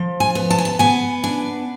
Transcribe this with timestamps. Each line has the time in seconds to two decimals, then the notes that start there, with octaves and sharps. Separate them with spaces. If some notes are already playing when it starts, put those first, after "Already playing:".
Already playing: F3
0.20 G#5
0.35 B3
0.50 A5
0.58 G#5
0.65 A5
0.79 B3 G#5
1.24 D4 G#5